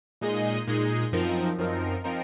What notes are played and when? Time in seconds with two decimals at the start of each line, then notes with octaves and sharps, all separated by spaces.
0.21 A#2 G#3 D#4 G#4 D#5
0.67 A#2 G#3 D#4 G#4 D#5
1.12 F#2 F3 C4 D#4 A#4
1.58 F#2 F3 C4 D#4 A#4
2.04 F3 C4 D#4 A#4